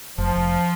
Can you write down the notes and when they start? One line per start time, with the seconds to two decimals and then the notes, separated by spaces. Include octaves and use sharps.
0.18 F1 F3
0.36 F1